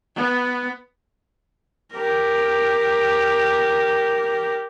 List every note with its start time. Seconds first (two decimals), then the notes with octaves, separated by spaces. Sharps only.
0.16 B3
1.94 G4 A#4